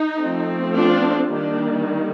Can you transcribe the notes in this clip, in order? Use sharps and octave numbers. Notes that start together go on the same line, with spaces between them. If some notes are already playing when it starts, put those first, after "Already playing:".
Already playing: D#4
F3 A3 C4
D4 F4
D#3 G3 A#3 D4